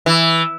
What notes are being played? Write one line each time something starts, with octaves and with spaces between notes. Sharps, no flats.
E3